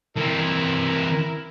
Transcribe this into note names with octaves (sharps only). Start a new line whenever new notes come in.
E3 C4 E4 A#4